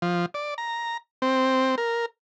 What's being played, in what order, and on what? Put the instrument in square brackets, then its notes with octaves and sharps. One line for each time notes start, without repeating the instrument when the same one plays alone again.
[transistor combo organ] F3
D5
A#5
C4
A#4